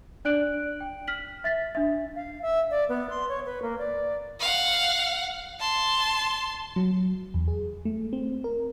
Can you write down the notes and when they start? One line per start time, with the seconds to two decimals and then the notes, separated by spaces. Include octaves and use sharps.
0.25 D4 D5 F#6 D7 F#7
0.81 G5
1.07 F6 B6 F#7
1.44 E5 A6 B6
1.75 D4 E5
2.16 F5
2.42 E5
2.70 D5
2.89 B3
3.10 C6
3.29 C#5
3.45 B4
3.62 A#3
3.79 D5
4.40 F5 F#5
5.60 A5 C6
6.76 F#3
7.34 E2
7.48 G#4
7.85 A3
8.13 C4
8.44 A#4